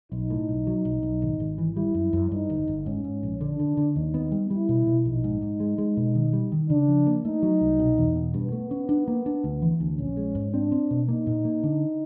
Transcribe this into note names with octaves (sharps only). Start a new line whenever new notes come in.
B1 D#4
A2
B1
F#3
B1
B1
G#1
G#1
E3
G3 E4
F#2
F#2
G2 D#4
G1
G1
G#2 C#4
G#2
A#1
D3 D4
D3
D3
D#2 D#4
B3
G3
G3 E4
B2
B2
A#1 D#4
G#2
G#2
G#3
G#3
B2
D#3
G3
D#3
C#3 D4
F3
A#3
A3 D#4
F#3
C2
B2
E2
B2
G2 B3
A3
C#4
D4
A#3
D4
D2
E3
D2
A#1 C#4
G#3
G#2
C4 D4
C4
B2
A#3 D#4
A#2
A#3
D3